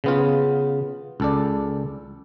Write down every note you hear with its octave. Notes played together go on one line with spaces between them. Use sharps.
C#3 B3 F4
C#2 A4 D5